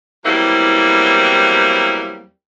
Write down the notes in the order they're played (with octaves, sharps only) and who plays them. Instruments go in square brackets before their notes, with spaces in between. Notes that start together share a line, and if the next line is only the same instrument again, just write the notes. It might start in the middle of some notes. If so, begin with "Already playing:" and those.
[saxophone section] E2 F#3 G3 A#3 C4 E4